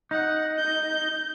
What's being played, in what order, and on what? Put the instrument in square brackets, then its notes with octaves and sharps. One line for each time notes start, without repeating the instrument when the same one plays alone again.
[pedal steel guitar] D#4 [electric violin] F#5
[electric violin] G6